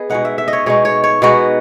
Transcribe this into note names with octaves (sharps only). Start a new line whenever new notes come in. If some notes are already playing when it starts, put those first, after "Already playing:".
Already playing: B3 G#4 D#5
B2 G#3 D#4 F#5
E5
E5
D#5
C#5
B2 G#3 D#4 C#5
C#5
C#5
B2 G#3 B3 D#4 F#4